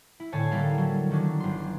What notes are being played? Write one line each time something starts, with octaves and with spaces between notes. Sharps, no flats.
E4
A2 D3 C#5 G#5 A5 C7
D3 G3 A#3 E4 A4 F5
F#3
D#3 F#3 C#4 D4
G1 C6